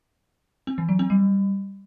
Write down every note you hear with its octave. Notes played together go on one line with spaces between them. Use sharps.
C4
E3
F#3
C4
G3